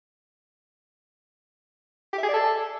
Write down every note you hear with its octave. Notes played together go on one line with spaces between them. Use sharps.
G4
E5
G#4
D5
A4